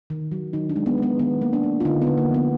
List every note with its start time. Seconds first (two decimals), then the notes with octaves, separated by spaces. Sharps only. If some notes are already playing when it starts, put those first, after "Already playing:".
0.10 D#3
0.32 F#3
0.53 D#3 D#4
0.70 D4
0.76 G#3
0.86 B3
0.98 G#3 B3
1.19 D#3 B3
1.42 A#3
1.53 D4
1.63 A#3
1.80 F4
1.85 D3 D#4
2.02 B3
2.07 D3
2.18 A#3
2.29 F3
2.34 B3